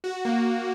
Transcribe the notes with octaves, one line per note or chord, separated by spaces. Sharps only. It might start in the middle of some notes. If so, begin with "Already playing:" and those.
F#4
A#3